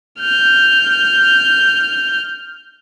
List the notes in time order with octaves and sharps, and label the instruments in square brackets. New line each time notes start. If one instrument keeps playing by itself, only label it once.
[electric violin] F6 G6